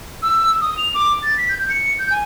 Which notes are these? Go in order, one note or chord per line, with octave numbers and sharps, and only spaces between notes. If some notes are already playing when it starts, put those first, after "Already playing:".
E6
D#6
F7
D6
A6
B6
G6
C#7
G6
G#5